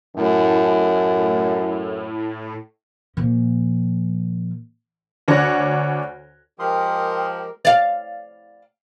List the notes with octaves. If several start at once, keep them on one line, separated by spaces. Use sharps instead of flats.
F#2 A2
A#2 F3
D2 D4 C#5 F#5 A#6
F3 G#3 G4 A#4 G5 C6 D#6
D5 F5